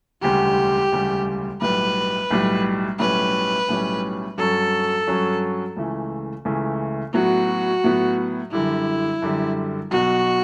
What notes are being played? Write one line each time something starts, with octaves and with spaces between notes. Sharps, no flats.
E1 D2 C#3 G3 G4
E1 D2 C#3 G3
B1 A2 G3 B4
B1 A2 G3
B1 A2 G3 C#4 B4
B1 A2 G3 C#4
G2 F#3 C#4 A4
G2 F#3 C#4
C#2 C#3 E3 A3
C#2 C#3 E3 A3
A2 F#3 B3 F#4
A2 F#3 B3
F#2 D3 G3 E4
F#2 D3 G3
B1 B2 F#3 F#4